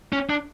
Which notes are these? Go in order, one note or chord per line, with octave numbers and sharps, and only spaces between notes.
C#4
D4